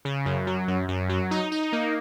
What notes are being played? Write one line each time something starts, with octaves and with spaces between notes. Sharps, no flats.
C#3
F#2
F#3
F#2
F#2
F#3
D#4
D#4
A#3